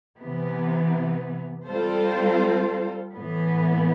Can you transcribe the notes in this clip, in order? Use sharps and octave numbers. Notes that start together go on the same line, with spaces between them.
C3 E3 B3
G3 C4 F4 A4 C5
A2 E3 B3